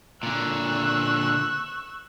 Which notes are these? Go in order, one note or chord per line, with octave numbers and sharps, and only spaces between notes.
A#2 D3 C#6 E6 F#6